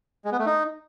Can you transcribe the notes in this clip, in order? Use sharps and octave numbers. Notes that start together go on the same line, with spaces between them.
G#3
B3
A3
D#4